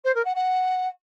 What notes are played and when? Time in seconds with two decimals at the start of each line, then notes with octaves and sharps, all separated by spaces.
0.04 C5
0.14 A#4
0.25 F#5
0.35 F#5